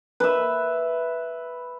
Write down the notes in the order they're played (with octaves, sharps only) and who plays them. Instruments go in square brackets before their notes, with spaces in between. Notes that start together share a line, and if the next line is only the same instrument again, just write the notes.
[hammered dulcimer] B4 E5